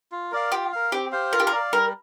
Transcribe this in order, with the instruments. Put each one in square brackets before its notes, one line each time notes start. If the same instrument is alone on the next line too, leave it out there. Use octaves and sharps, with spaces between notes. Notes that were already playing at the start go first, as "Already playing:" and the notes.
[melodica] F4
A#4 D5 F5
[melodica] F4 [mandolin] G4
[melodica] A#4 F5
[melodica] C4 [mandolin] G4
[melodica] G4 C5 F5
[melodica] F4 [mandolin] A#4
[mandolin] G4
A#4
[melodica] D5 F5
[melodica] G3 [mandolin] A#4